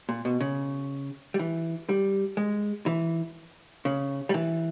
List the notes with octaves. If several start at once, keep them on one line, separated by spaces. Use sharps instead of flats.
A#2
B2
C#3
G3
E3
G3
G#3
E3
C#3
G3
E3